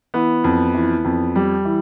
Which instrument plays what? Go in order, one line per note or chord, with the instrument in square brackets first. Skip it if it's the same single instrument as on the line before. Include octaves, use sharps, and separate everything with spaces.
[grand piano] E3 B3
F2
E3
F2
G3
E3